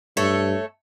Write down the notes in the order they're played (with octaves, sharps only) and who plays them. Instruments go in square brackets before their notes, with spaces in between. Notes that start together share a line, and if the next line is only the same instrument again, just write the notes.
[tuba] G2 [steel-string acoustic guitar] A3 A4 C#5